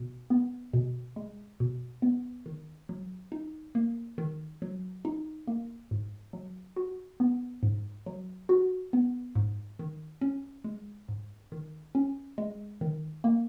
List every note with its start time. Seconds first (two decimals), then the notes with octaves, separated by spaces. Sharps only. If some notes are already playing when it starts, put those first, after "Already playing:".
Already playing: B2
0.30 B3
0.73 B2
1.16 G#3
1.60 B2
2.02 B3
2.46 D#3
2.89 F#3
3.32 D#4
3.75 A#3
4.18 D#3
4.62 F#3
5.05 D#4
5.47 A#3
5.91 G#2
6.33 F#3
6.76 F#4
7.20 B3
7.63 G#2
8.06 F#3
8.49 F#4
8.93 B3
9.35 G#2
9.79 D#3
10.21 C#4
10.64 G#3
11.08 G#2
11.52 D#3
11.95 C#4
12.38 G#3
12.81 D#3
13.24 A#3